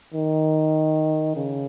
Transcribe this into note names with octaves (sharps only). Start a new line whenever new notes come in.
D#3
C#3